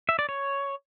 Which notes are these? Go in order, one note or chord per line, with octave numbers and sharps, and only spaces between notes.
E5
D5
C#5